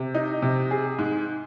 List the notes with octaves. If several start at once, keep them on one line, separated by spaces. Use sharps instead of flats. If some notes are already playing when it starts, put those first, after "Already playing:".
Already playing: C3
D#4
C3
G#4
G#2